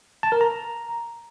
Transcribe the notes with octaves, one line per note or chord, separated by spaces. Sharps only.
A5
A#4
A#5